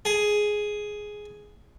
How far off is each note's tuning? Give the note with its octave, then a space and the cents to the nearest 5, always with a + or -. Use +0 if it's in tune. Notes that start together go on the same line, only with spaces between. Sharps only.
G#4 +5